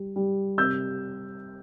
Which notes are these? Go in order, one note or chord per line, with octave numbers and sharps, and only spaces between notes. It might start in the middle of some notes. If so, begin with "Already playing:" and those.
Already playing: G3
G3
C3 E6 G6